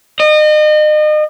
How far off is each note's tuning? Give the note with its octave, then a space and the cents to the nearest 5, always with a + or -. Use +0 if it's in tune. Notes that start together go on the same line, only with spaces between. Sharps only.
D#5 -35